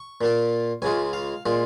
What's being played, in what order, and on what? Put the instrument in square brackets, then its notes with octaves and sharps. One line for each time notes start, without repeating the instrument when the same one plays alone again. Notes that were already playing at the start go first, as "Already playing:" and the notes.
Already playing: [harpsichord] C#6
A#2 A#3 F4
C#2 C#3 G#3 F4 G#5
F5
A#2 G#3 F4